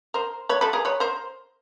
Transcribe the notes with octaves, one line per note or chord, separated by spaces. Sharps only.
A#4 C5
B4 C#5
A4 B4
G#4 A#4
B4 C#5
A#4 C5